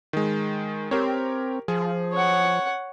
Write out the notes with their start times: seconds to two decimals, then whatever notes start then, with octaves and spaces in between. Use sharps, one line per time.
0.13 D#3 G#3
0.91 C4 G4 A#4 C#5
1.68 F3 G#4
2.13 C#5 F#5